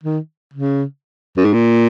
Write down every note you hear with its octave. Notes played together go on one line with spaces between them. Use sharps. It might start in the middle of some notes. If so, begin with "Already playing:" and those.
D#3
C#3
F#2
G#2
A#2